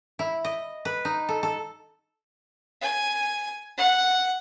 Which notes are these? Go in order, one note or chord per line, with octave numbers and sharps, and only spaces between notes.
E4
D#5
B4
D#4
A4
A4
G#5
F#5